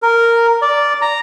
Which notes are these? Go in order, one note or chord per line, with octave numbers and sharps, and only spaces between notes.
A#4
D5
A#5